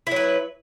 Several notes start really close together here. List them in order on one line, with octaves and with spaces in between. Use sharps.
E4 F#3 B4